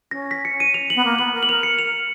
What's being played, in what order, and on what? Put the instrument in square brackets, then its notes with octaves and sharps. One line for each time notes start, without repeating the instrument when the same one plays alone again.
[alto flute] C#4 [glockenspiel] A#6
[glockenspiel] B6
C#7
D#7
F7
F#7
[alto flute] B3
A#3
[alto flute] B3 [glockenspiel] F#7
[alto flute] A#4
[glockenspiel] F#7
[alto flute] A#4 [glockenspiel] F7
[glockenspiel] C#7
F7